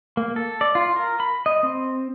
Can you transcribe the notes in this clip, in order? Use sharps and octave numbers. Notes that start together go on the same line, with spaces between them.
A#3
A4
D5
F4
A#4
B5
D#5
C4